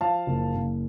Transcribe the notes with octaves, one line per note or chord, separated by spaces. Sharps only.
F3 F5 A5
F#1
F#1